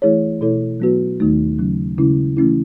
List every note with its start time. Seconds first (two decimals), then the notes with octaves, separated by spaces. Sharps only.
0.02 E3 A3 E4 G#4 C#5
0.41 B2 A3 E4 A4 C#5
0.80 F#3 B3 F#4 B4
1.20 D#2 D#3 A3 D#4
1.59 C#3 F#3 C#4
1.98 C#3 G#3 C#4 E4
2.37 E3 A3 C#4 E4